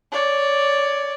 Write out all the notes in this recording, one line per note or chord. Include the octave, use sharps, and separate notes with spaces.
C#5 D5